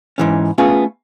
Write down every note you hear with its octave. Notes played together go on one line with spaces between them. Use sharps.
G#2 E3 C#4
A3 B3 C#4 F4 G#4